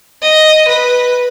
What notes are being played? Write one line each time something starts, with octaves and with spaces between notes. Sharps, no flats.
D#5
B4